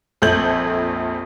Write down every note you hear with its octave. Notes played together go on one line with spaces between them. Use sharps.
A#1 F2 A4 G6 G#6 F#7